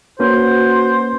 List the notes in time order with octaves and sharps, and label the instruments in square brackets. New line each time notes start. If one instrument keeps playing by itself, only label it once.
[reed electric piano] A#3 C#4 B4 [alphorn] F#4 [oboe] C5